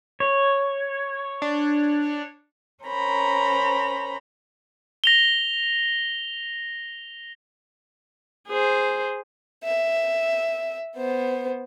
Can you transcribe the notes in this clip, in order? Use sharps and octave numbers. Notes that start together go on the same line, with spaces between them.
C#5
D4
C#4 A#4 C5 A#5 B5
A#6 F7 G7
G#4 C5
E5
B3 C5